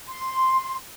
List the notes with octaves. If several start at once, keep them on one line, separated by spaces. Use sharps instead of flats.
C6